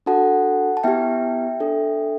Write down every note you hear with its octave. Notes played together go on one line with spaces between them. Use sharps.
D4 F#4 A4 F#5 A5
A5
B3 E4 G4 E5 G5
D4 A4